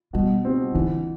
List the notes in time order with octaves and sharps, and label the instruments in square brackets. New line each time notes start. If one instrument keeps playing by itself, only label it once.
[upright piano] B2 [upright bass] G3
[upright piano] G3 C4
[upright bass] D3 [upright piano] E3